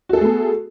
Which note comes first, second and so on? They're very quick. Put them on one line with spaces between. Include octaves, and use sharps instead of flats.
F#4 A4 G#4 A3 B3